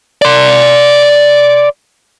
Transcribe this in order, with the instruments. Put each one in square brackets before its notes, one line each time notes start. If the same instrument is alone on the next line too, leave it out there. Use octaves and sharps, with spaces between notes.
[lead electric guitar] D5 C6